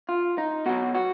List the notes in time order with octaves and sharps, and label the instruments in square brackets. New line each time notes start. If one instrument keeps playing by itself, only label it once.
[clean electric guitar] F4
D#4
B2 F#3 F#4
F#4